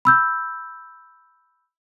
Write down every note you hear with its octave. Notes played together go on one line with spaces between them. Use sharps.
B5 E6 G6